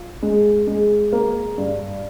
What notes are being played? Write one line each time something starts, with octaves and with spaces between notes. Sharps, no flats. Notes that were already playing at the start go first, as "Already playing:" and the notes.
Already playing: F4
G#3
G#3
A#3
G2